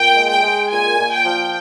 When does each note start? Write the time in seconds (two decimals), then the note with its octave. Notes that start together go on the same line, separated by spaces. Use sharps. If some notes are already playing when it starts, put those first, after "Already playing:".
Already playing: A#2 G5
0.16 G#3
0.29 G5
0.44 G#3
0.71 A#2 G#5
0.99 A#2
1.12 G5
1.25 F3